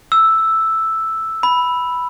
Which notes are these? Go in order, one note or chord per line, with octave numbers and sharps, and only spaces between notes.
E6
B5